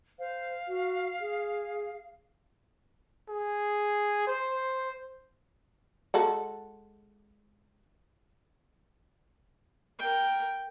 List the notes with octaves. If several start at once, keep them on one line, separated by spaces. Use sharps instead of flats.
C5 F5
F#4
G#4
G#4
C5
G#3 F#4 A4
A#4 G5